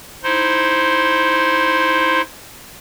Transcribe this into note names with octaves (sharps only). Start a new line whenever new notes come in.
D#4 E4 C5 C6